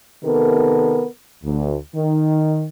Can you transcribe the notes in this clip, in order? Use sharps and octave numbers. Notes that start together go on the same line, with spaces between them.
C3 D#3 B3 A4 A#4
D2
D#3